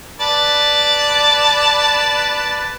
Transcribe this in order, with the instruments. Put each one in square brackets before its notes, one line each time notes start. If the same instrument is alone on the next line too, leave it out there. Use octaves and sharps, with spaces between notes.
[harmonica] B4 D5 A5